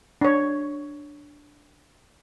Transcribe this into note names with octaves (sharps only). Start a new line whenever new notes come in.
D4 C#5